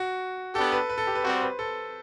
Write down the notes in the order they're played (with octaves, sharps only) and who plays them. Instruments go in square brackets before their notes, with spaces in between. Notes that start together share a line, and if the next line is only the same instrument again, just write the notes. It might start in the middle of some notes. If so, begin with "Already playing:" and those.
Already playing: [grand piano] F#4
[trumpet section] B3 D4 G4 [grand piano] A4
[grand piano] B4
B4
A4
G4
B4
[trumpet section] G3 C4 F#4 [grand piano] C5
[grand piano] B4
A4